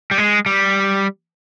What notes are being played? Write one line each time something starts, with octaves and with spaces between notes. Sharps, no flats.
G3
G#3
G3